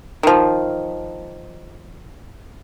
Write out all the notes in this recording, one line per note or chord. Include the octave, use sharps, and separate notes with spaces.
D#3 F3